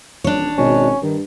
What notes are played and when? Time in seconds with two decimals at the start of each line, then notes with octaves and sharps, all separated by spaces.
0.24 D#1 D4 C#5
0.58 G#1 B2 C#4
1.02 G2 D#3